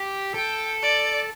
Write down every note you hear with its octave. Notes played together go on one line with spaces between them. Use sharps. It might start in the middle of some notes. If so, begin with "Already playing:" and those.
Already playing: G4
A4 G5
D5